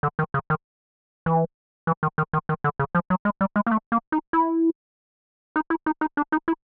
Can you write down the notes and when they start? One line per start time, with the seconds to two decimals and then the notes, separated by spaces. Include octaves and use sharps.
0.03 D3
0.19 D#3
0.34 C#3
0.50 D#3
1.26 E3
1.87 E3
2.03 D#3
2.18 D#3
2.33 D#3
2.49 D#3
2.64 D3
2.79 C#3
2.95 F3
3.10 F#3
3.25 G#3
3.41 G3
3.56 G#3
3.67 A#3
3.71 A3
3.92 A#3
4.12 D#4
4.33 E4
5.56 D#4
5.70 E4
5.86 D#4
6.01 D#4
6.17 D4
6.32 D#4
6.48 E4